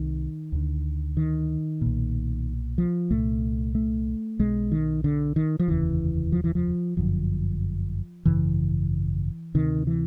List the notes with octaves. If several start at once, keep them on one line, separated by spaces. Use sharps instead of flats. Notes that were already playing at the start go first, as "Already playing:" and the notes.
Already playing: C2 C3 D#3
D2 D3
D#3
B1 A#2
F3
C2 A#2 A3
A3
B1 B2 G#3
D#3
D3
D#3
F3
F1 D#2 C#3 E3
F3
E3
F3
G1 F#2 D3 F3
G#1 F#2 C#3 E3
D2 C3 D#3
E3